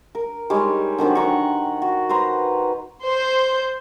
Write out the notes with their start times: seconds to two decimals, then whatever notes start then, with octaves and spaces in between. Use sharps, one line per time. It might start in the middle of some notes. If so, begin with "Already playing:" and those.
0.15 A#4
0.50 G3 G#3 D#4 C#5
0.98 D3 D#3 F#3 C4
1.15 F#5 G5 A#5 C#6
1.82 F#4
2.09 B4 C5 A#5 C6
3.05 C5